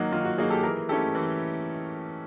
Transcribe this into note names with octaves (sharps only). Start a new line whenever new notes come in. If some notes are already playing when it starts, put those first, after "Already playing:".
Already playing: D#3 F#3 A#3 D#4 F#4
D#3 F4
F#4
F#3 A#3 D#4 F#4 G#4
G4 A4
E3 G#4 A#4
A3 C#4 E4 G4 A4
E3